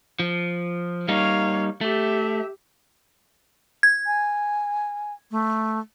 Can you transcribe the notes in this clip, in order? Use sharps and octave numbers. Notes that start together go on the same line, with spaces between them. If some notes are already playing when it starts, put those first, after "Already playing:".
F3
G3 A#3 D#4 C#5 F5
A3 G4 E5
G#6
G#5
A3